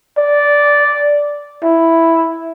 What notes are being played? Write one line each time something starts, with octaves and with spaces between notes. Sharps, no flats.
D5
E4